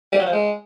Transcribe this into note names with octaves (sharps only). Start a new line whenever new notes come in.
G3
F#3
F3
G#3